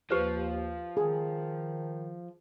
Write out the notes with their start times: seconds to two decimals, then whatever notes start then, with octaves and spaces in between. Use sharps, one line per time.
0.11 D#2 F3 G4 B4 C5
0.97 D#3 G#4